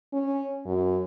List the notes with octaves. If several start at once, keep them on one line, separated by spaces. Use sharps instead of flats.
C#4
F#2